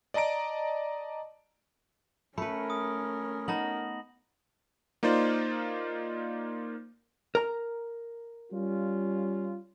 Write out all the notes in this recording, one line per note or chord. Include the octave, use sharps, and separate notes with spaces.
D5 D#5 A5 A#5 D7
A3 C#4 A#4 B4 B5 C#7
D#6
B3 D#4 A5 A#6 F#7
A#3 D#4 F4 C5 D5
A#4 A#5
G3 C#4 F4